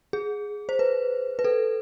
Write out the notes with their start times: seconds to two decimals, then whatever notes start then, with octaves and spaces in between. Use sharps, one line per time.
0.13 G#4
0.69 C5
0.79 B4
1.39 B4
1.44 A4